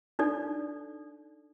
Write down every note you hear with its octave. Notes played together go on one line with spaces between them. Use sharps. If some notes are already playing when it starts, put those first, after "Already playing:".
D4 D#4 A4 D5